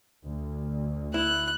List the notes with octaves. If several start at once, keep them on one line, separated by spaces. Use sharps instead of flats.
D2
E4 F#6